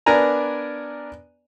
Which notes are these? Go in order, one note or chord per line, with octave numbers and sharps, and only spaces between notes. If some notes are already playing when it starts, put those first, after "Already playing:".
B3 D4 A#4 D5 G#5 A#5